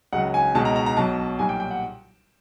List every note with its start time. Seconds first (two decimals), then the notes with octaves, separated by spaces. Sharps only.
0.13 C#2 C#3 F#3 F#5
0.34 G#5
0.55 C#2 B2 G#3 A5
0.65 A#5
0.76 A#5
0.86 A#5
0.97 B1 B2 F#3 A5
1.39 B1 A#2 G3 G#5
1.49 G5
1.60 G5
1.71 F#5